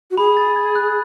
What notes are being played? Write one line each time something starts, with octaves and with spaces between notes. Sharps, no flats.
F#4
G#4 B5
A6
G#6
F#6